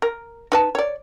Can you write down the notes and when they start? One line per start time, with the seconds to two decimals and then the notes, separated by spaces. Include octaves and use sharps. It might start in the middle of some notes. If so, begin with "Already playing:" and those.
0.02 A#4
0.52 D#4 B4 A5
0.75 C#5 D5